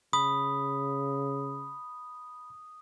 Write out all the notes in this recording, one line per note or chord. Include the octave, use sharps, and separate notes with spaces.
C#3 B5 D#6